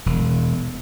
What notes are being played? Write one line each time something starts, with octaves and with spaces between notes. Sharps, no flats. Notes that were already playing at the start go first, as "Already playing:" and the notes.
E1